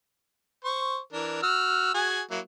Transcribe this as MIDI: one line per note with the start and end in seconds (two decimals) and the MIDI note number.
0.64 0.99 72
0.64 0.99 85
1.13 1.38 52
1.13 1.38 62
1.13 1.38 70
1.43 1.90 66
1.43 1.90 88
1.43 1.90 89
1.94 2.22 66
1.94 2.22 68
1.94 2.22 80
2.31 2.39 54
2.31 2.39 58
2.31 2.39 64